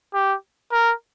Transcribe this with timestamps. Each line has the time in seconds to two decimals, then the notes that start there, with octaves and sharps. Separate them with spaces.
0.14 G4
0.72 A#4